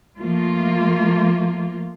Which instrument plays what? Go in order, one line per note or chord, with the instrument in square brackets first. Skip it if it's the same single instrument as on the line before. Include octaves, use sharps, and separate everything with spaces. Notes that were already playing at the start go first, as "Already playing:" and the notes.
[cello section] F3 A3 A#3 F4